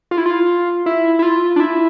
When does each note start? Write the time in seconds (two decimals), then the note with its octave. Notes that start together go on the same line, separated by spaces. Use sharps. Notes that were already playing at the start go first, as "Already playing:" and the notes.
0.11 F4
0.18 E4
0.26 F4
0.86 E4
1.19 E4
1.22 F4
1.56 D4
1.60 E4